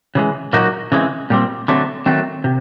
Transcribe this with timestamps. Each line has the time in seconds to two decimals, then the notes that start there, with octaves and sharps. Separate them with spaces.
0.15 C#3 E3 G#3
0.53 A#2 F#3 A#3 D#4 F#4
0.92 C#3 E3 G#3 C4
1.30 A#2 G3 C4
1.68 D3 F#3 A3 C4
2.06 D#3 F#3 A3 C4
2.44 C3